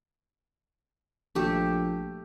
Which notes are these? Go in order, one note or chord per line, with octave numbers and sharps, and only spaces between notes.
A#1 A3 G4